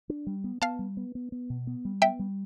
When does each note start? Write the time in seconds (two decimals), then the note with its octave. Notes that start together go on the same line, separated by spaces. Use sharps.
0.09 D4
0.27 G3
0.44 B3
0.61 B3 F5 A5
0.79 G3
0.97 B3
1.15 B3
1.32 B3
1.50 B2
1.67 B3
1.85 G3
2.02 B3 E5 G5
2.19 G3